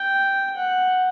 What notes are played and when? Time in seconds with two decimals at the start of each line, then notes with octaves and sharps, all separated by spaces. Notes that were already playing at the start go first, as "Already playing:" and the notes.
Already playing: G5
0.57 F#5